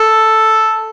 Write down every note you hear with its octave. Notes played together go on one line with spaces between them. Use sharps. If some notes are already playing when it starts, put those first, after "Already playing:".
Already playing: A4